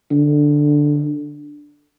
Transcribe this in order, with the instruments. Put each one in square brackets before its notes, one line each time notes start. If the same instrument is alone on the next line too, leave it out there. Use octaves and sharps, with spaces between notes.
[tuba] D3